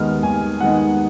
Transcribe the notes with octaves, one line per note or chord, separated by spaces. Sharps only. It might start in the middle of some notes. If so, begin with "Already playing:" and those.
Already playing: D#2 D#3 G#3 B3 D#4 F6
D#2 G#5
D#3 G#3 B3 D#4 F#5